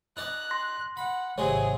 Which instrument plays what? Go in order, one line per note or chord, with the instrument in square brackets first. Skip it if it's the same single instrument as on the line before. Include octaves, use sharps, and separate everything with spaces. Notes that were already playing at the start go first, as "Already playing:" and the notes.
[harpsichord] D#4 D5 [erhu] F#6
[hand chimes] C6 A#6
[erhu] F#5 [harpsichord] B5
[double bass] G#1 [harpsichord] C3 F#3 G#3 [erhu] G#4 [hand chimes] C#5